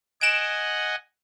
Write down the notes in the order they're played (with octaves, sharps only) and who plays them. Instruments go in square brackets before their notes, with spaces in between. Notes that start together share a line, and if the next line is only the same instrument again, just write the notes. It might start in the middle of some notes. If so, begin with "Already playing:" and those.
[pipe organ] D#5 F#5 G#5 [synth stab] D7 E7